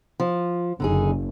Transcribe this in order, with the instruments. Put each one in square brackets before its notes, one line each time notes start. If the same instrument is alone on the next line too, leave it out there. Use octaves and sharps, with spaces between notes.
[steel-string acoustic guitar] F3
[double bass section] F#1 [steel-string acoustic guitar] D3 D#4 G#4